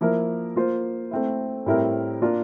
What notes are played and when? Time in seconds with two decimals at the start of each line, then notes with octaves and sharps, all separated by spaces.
0.01 F3 A#3 E4 A#4
0.56 A#3 F4 C5
1.11 A3 C4 E4
1.66 A2 G3 C4 E4 A#4
2.21 A#3 D4 F4 A#4